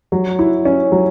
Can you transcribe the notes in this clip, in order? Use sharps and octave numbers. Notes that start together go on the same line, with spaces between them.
F#3
E4
C#4
F#3